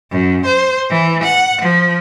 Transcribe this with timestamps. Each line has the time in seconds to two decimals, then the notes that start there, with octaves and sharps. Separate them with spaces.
0.11 F#2
0.46 C5
0.90 E3
1.24 F#5
1.62 F3